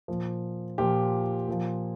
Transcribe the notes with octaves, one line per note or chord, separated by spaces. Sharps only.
A#2 F3
A#2 F3 G4
A#2 F3